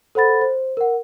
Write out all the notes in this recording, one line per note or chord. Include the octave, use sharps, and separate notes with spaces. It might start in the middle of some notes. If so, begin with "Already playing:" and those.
A4 C5 F#5 B5 A6
C5
A#4 F#5